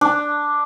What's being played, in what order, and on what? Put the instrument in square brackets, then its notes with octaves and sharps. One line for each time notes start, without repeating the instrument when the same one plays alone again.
[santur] D4